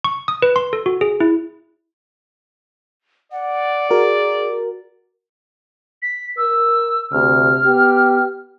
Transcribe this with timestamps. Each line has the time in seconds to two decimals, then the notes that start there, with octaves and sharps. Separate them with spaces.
0.04 C#6
0.28 D#6
0.42 B4
0.56 C6
0.73 A4
0.86 F#4
1.01 G#4
1.20 E4
3.32 D5 F#5
3.91 F#4 G#4 A#4
6.02 B6
6.37 A#4 E6
7.12 D2 C3 F6
7.66 B3 G4